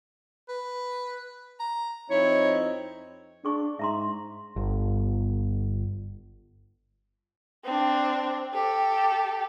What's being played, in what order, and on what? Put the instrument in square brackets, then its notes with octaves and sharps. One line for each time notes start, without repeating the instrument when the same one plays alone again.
[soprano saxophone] B4
A#5
[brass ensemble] F2 C4 D#4 [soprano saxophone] E4 [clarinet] C#5
[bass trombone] D4 [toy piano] G#4 C#6 D6
[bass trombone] G#2 [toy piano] E5 A#5 C6
[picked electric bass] G1
[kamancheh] C4 D4
G4 A4